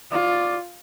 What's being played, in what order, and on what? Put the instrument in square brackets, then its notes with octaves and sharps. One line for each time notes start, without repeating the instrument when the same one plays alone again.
[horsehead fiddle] F4 [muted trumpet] D5